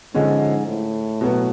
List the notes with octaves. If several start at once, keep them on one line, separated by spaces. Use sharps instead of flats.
G#2 D3 F3 G#3 C#4
A2
B2 F#3 B3